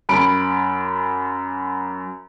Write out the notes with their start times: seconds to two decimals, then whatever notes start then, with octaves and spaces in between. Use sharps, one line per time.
0.09 F#2 B5 D7